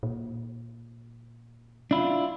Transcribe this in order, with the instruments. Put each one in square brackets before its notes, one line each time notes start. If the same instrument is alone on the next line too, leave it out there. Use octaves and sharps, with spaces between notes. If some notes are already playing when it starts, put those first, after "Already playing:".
[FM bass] A#2
[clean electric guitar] D4 E4 F4